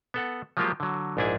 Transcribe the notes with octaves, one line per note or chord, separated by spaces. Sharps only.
B3 A4 F#5
F3 F#3 G#3 A#3 F4 G4
D3 F#3
A#1 G#2 D4 E4 G#4 G#5